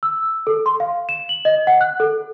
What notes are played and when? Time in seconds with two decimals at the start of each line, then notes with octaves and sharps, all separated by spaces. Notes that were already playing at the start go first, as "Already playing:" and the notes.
0.03 E6
0.47 A4
0.66 C6
0.80 F5
1.09 E7
1.29 F#7
1.45 D#5
1.67 F#5
1.81 F#6
2.00 A4